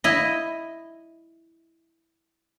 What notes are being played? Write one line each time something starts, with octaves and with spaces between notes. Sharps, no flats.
E4 D#5